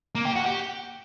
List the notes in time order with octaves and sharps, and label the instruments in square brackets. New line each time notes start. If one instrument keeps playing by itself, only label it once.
[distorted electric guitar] A#3
G4
F#4
G4